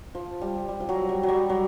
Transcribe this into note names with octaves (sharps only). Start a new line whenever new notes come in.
F3
G3
G3
F3
F#3
G3
F#3
G3
F#3